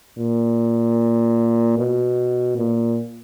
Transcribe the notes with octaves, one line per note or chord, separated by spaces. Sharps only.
A#2
B2
A#2